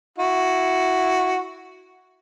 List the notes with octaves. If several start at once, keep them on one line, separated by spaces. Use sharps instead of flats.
E4 F#4